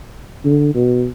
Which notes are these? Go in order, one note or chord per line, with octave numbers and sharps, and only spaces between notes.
D3
B2